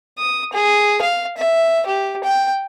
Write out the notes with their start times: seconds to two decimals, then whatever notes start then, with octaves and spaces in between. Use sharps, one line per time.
0.18 D#6
0.53 G#4
1.01 F5
1.37 E5
1.86 G4
2.24 G5